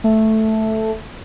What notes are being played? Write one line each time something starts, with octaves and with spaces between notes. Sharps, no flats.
A3